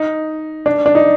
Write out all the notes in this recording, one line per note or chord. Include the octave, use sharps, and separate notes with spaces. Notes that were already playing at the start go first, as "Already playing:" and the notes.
Already playing: D#4
D4
D4
D#4